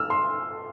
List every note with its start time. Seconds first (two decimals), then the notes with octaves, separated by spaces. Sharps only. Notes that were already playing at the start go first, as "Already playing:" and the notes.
Already playing: E6 F6
0.10 C6